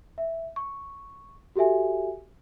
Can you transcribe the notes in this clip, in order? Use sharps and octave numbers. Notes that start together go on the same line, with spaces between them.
E5
C#6
F#4 G4 A4 E5 G#5